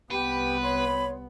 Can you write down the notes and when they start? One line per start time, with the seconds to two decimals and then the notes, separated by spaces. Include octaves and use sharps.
0.11 C2 B3 G4 B4
0.62 C#5 B5 C6